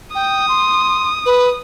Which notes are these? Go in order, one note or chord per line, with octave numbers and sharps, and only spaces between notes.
G5 D#6
C6
B4